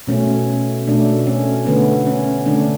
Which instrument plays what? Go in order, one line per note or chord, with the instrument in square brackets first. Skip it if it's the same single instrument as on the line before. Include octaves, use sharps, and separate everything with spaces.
[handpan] B2 A3 C#4
B2 A3 D4
C#4
D3 A3 B3
C#4
D3 A3 D4